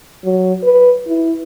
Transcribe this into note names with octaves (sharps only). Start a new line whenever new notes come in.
F#3
B4
E4